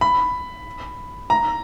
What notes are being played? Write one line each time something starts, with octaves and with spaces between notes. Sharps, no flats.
B5
A#5